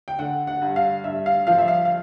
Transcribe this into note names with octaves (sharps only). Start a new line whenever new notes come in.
G5
D3 F#5
F#5
G2
F5
G2 E5
F5
F3 F5
E5
F5
F5